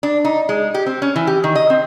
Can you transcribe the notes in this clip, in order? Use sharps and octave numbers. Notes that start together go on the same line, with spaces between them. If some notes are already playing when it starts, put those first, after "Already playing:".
D4
D#4
G#3
G4
C4
C#4
E3
G4
D#3
D#5
C4